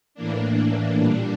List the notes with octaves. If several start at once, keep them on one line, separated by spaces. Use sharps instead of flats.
A2 E3 A#3 D4
A#2 G3 D4